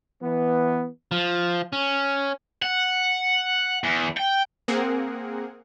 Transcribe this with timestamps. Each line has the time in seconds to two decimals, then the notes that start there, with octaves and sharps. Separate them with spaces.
0.22 E3 B3
1.12 F3
1.73 C#4
2.62 F#5
3.84 E2
4.17 G5
4.68 A#3 C4 G#4 A#4 F#5